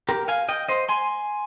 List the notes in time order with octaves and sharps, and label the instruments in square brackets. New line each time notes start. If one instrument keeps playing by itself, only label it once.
[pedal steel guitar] G4 A#4
F5 G#5
D#5 G5
C5 D#5
G#5 C6